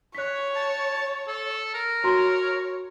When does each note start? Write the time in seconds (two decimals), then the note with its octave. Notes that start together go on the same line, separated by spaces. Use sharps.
0.15 C#5 F#6 B6
0.56 A5
1.28 A4
1.74 A#4
2.04 F#4 C#5 A#5 C6